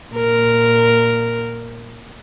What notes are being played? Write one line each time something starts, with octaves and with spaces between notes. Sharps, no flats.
A#2 A#4